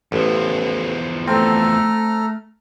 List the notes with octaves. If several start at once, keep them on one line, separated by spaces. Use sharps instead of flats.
A1 E2 F3
A3 C4 A4 A#5 F6